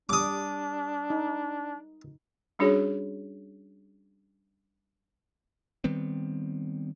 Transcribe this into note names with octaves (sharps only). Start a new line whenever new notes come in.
G3 D4 D6 D#6
D#4
G3 C#4 D4 F#4 G#4 C#5
D#3 G3 B3 C4